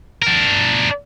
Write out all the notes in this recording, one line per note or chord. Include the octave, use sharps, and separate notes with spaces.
D4 A#4